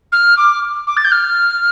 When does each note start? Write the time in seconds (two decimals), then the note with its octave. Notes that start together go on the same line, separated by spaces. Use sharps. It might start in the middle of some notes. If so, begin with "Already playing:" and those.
0.12 F6
0.37 D6
0.87 D6
0.97 A6
1.04 G6
1.11 F6